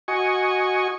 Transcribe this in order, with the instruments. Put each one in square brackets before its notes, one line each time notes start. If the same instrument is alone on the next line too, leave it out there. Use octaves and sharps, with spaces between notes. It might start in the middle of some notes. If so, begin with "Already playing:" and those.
[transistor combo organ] F#4 D#5 G#5 C#6